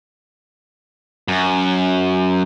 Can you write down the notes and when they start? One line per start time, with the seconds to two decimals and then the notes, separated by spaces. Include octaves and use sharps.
1.28 F#2